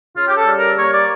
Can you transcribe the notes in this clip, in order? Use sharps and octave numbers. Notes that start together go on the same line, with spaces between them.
C#3 F4
G4
A4
G3
A#4
A#3 C#5
D5